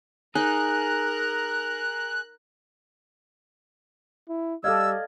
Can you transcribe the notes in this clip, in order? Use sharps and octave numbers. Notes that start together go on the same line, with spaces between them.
D#4 G#4 A#4 A#5 F#6
E4
G3 A4 D5 D#5 F5 E6 F6 G#6